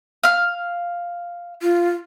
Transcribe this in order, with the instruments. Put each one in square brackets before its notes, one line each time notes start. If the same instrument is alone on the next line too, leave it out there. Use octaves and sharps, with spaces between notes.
[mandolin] F5 F6
[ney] F4